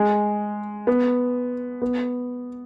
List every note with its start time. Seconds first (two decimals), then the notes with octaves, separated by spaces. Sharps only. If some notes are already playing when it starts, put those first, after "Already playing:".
Already playing: G#3
0.87 B3
1.82 B3